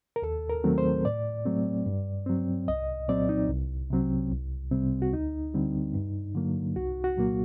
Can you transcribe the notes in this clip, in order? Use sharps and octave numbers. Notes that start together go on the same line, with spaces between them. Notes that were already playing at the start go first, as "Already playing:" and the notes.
A#4
D#2 A4
A#4
D#3 F#3 A3 C4
C5
A2 D5
F#3 A3 C4
G2
F#3 C4
C2 D#5
A#2 F#3 C4 D5
D#4
C2
C3 F#3 C4
C2
C3 G3 C4
F#4
D2 D#4
D3 G3 C4
G2
D3 F#3 A#3
C2 F#4
F#4
A#2 F#3 A#3